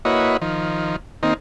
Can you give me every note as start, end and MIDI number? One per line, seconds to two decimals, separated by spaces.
0.05 0.37 58
0.05 0.37 64
0.05 0.37 66
0.05 0.37 71
0.05 0.37 73
0.05 0.37 75
0.41 0.96 51
0.41 0.96 53
1.23 1.34 51
1.23 1.34 58
1.23 1.34 60
1.23 1.34 63